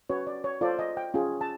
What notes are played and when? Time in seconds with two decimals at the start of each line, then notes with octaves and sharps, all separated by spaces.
0.10 C#4 F#4 B4 C#5
0.27 D5
0.44 C#5
0.61 F4 A4 C5 D5
0.79 D#5
0.97 G5
1.14 C#4 F4 G#4
1.41 A5